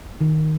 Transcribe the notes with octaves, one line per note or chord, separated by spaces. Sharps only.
D#3